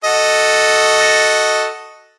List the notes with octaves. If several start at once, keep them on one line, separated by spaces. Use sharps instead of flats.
F#4 A4 D#5